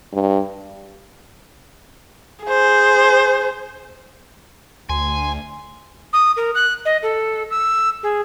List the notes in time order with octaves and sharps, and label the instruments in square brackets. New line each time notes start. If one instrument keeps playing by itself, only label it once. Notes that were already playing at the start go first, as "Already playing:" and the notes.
[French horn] G2
[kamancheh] G#4 C5
[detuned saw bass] D2 [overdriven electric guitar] G#5 [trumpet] C6
[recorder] D#6
A#4
F#6
D#5
A4
E6
G#4